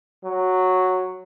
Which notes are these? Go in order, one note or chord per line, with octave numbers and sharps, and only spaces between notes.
F#3